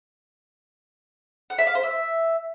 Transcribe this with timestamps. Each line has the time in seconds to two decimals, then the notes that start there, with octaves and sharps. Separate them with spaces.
1.50 F#5
1.58 E5
1.67 F5
1.75 C5
1.83 E5